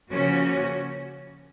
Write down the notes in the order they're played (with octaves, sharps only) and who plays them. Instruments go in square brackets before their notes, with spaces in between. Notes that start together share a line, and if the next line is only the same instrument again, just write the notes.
[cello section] C#3 F3 A#3 C#4 F#4